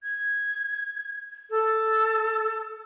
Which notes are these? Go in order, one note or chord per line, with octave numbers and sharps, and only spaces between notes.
G#6
A4